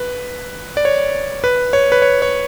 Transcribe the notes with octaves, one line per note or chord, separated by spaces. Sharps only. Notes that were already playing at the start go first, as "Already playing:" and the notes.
Already playing: B4
D5
C#5
B4
C#5
B4
C#5
C#5